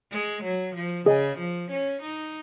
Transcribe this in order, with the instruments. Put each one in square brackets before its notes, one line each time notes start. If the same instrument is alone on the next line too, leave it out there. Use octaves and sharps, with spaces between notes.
[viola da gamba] G#3
F#3
F3
[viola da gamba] C#3 [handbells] G#4 D#5 G#5
[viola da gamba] F3
C#4
D#4